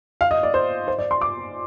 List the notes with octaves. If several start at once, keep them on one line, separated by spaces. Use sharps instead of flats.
F5
D#5
D5
C5
C5
D5
C6
D6